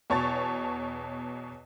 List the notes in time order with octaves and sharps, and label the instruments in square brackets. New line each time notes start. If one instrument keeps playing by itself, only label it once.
[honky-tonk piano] E2 B2 C#5 A5 C#6 A6